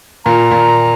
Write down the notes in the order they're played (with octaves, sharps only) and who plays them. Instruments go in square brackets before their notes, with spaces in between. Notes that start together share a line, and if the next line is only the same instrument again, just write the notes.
[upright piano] A#2 [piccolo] A#5
[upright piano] A#2